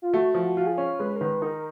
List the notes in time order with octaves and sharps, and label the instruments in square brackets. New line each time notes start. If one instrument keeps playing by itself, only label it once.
[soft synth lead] F4
[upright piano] A3 [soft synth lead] F#4
[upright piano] F3
[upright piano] F4 [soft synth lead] F#4
[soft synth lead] G#4
[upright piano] C#4
[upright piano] G#3 [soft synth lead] B4
[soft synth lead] A#4
[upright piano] D#3 [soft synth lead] B4
[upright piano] D#4 [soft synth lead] A#4